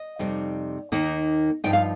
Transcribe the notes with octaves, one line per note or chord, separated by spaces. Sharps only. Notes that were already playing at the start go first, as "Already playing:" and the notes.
Already playing: D#5
F2 C3 G3 D#4
D#2 D#3 A#3 D#4
G2 F3 D#4 G5
F5